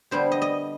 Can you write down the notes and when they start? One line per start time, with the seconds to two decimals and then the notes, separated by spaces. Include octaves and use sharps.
0.11 D3 G3 B3 C5
0.32 D#5
0.42 D#5